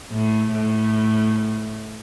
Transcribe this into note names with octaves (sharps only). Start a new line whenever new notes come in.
A2
A2